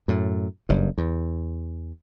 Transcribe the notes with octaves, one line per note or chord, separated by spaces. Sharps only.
F#2 A2
F#1 G2
E2